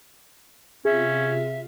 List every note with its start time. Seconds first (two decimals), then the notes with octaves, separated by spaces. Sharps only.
0.85 C3 C#4 F4 G#4 E5 F5